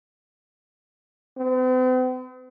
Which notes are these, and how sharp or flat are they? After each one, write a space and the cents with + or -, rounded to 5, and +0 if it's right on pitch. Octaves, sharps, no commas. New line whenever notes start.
C4 -45